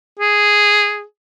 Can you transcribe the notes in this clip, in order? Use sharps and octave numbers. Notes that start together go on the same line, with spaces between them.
G#4